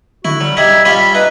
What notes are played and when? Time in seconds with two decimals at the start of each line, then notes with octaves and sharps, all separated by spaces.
0.25 D3 E4 F#4
0.41 F#3 G3
0.57 D#1 G3 D#4 E5 G#6
0.85 G3 C#4 F4 E5 B5
1.15 D#4 B4